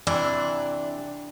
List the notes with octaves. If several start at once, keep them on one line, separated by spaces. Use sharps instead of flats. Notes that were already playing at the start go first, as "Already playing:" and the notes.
C3 E3 D4